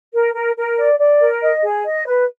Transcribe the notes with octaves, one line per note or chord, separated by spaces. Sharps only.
A#4
A#4
A#4
D5
D5
A#4
D#5
G#4
D#5
B4